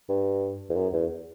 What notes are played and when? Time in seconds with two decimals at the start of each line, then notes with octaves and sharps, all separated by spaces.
0.09 G2
0.69 E2
0.76 F#2
0.93 E2